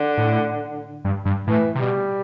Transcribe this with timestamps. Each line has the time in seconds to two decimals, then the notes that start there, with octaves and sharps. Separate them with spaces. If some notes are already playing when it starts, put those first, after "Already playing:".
Already playing: D3
0.18 A2
1.05 G2
1.25 G2
1.47 A2 E3
1.75 C3
1.80 B2 G3